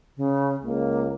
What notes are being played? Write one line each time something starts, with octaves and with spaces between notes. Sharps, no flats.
C#3
C#2 A#3